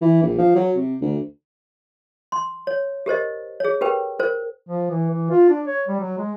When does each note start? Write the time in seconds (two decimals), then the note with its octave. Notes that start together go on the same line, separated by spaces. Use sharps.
0.02 E3
0.22 A#1
0.38 F3
0.55 F#3
0.76 C3
1.02 D2
2.32 C6
2.67 C#5
3.06 G4 A#4 C5 D#5
3.60 G#4 C#5
3.81 G4 A#4 B4 G5
4.19 A#4 C5
4.67 F3
4.90 E3
5.10 E3
5.30 F4
5.50 D4
5.67 C#5
5.88 G3
6.00 F#3
6.18 G#3